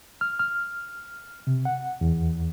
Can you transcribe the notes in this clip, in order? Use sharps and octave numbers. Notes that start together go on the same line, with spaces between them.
F6
F6
C3
F#5
E2